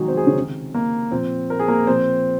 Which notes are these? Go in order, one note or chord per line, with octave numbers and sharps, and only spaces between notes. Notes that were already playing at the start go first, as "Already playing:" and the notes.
Already playing: C3 D#3 F3 F#3 G#3 D#4 F#4 G#4
C4 C5
G#3 G#4
C#3 C#4
C3 D#3
A#3
A#2 F3 C4
A#4
G#4
A#3 A#4
A#2 F3 C4 C5